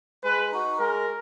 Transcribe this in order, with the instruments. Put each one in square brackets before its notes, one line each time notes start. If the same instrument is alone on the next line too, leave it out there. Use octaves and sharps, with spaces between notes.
[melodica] G#3 [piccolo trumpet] B4
[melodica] D#4 F#4
[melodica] G#3 [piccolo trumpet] A#4